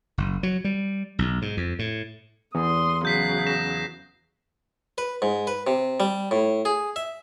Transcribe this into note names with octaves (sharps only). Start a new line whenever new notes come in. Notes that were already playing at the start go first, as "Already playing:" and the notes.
F#1
F#3
G3
B1
G#2
F2
A2
E2 C6 D#6
C#3 F#3 G6 B6 C7
A#6 B6 E7
B4
G#2
B4
C3
G3
A2
G#4
E5